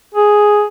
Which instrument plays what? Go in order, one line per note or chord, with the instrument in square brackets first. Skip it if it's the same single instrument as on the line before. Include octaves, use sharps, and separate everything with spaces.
[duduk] G#4